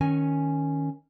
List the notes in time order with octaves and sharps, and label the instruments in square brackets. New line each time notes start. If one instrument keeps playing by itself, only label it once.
[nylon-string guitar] D#3 C#4 G#5